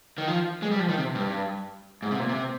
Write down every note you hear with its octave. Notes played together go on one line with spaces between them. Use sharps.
D#3
F3
G#3
G3
F3
D#3
C3
G2
G#2
C3
A#2
C3